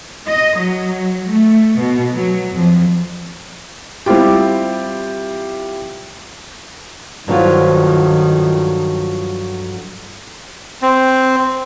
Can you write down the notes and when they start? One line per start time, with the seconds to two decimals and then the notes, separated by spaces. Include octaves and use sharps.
0.27 D#5
0.61 F#3
1.29 A3
1.78 B2
2.15 F#3
2.52 F2
4.06 G3 C4 E4 F4 G4
7.28 G2 D3 D#3 F3 F#3 F4
10.82 C4